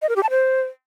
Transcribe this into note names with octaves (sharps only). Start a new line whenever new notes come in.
D#5
A#4
G4
A5
C5